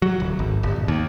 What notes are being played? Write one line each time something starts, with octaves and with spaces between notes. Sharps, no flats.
F#3
D1
G#1
G1
D#1
D#2